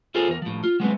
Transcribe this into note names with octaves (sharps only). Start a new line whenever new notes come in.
E4 F4 G#4 A4 C5
E2 A#4
A2 F3
F4
F#3 G#3 B3 C4